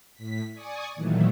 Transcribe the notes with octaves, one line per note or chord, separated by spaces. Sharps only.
A2 B6
D5 G#5 C#6 D#6
A#2 D#3 E3 F#3 A3